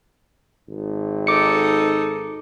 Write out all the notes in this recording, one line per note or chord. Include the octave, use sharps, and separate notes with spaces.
G#1
D#4 A4 D6 C#7